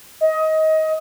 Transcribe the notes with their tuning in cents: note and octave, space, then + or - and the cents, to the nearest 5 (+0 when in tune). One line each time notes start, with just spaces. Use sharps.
D#5 +20